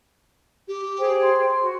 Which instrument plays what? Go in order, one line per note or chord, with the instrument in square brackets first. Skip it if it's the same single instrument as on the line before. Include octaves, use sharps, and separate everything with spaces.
[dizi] G4
[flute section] G#4 C5 G5
[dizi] C6
[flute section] F#4